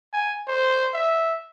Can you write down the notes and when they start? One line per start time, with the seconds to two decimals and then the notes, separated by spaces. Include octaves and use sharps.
0.13 G#5
0.48 C5
0.94 E5